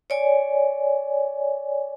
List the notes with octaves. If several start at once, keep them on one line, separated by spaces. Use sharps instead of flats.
C#5 D5 G#5